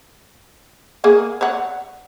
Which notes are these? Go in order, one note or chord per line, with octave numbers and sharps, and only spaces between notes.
A#3 G#4 F#5
C#5 D5 F#5